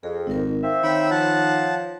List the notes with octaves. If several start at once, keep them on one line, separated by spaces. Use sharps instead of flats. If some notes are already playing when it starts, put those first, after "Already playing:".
F2 G#4
G#1 D#4 A#4
C4 F4 E5
D#3 C#5 G5 B5 E6
F3 F#5 A5